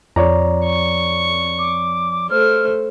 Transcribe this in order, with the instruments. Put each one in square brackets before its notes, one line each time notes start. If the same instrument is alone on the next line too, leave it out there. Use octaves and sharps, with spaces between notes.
[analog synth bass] F2 [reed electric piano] C#5 D5 A#5
[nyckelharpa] C#6
[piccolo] D6
[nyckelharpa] A3 C5 [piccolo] F6